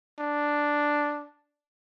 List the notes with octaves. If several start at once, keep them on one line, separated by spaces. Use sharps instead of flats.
D4